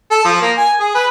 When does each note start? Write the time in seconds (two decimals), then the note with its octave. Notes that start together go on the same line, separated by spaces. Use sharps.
0.11 A4
0.25 F3
0.41 A#3
0.57 G#5
0.80 G#4
0.95 B4